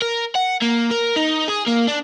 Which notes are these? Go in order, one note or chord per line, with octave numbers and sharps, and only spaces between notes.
A#4
F#5
A#3
A#4
D#4
G#4
A#3
D4